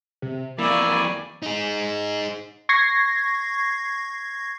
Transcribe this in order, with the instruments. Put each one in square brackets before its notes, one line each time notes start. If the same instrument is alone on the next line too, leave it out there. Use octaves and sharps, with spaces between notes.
[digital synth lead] C3
[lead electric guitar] F2 E3 [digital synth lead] A#3 [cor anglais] E4 [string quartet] D5 G#5 C#6
[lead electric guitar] D#4 G#4
[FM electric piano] C#6 G#6 A#6 C7